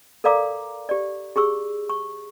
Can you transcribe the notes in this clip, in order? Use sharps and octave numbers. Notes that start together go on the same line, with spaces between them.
A4 A#4 D5 F5 A#5 D6
G4 D5
G4 G#4 C#6 E6
C#6